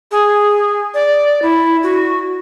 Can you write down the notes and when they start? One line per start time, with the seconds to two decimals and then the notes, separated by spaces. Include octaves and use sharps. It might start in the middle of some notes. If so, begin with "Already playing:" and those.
0.11 G#4
0.94 D5
1.42 E4
1.83 F#4